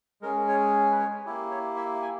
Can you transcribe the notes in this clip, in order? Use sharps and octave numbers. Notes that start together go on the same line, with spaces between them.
G#3 C#4 G#4 A#4
C#5
B4
C#5
A#3 E4 G4
C#5
E5
G#5